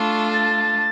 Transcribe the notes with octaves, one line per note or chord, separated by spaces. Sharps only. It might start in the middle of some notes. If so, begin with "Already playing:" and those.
Already playing: A3 D4 F4 A4 C#6
A6